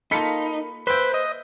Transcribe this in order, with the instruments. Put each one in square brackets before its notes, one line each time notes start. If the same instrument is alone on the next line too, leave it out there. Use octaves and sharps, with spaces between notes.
[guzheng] A#3 F4 A4 [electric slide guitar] D#4 [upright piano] B5 B6 C#7
[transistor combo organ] B4 [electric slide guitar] C5 [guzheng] E5 G5 [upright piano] E6 G6
[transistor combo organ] D#5